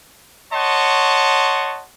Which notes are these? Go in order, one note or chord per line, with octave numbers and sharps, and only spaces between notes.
C#5 D#5 F#5 A5 C6 C#6